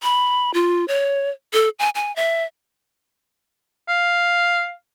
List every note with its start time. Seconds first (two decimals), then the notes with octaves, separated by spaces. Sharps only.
0.03 B5
0.54 F4
0.88 C#5
1.53 A4
1.79 G#5
1.95 G#5
2.16 E5
3.88 F5